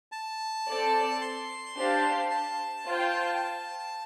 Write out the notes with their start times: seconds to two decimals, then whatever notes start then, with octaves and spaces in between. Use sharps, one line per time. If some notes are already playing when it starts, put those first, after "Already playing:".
0.12 A5
0.67 C4 A4 D5
1.21 C6
1.76 D4 G4 C5 F5 A5
2.31 A5
2.86 F4 C5 G5